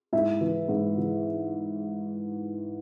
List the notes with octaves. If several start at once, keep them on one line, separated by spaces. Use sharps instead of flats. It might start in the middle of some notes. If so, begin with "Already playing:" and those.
G#2 E4 E5
E3
G#2
E3